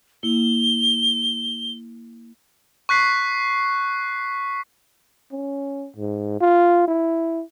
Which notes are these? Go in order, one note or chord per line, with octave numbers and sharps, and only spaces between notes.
A#3 E4 G7
C#6 F#6 B6 C7
C#4
G#2
F4
E4